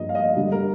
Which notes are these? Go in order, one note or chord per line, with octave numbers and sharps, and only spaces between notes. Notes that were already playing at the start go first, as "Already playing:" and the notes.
Already playing: G2 F3 A#3 D#5
F5
D#5
D3 G3 D4
A#4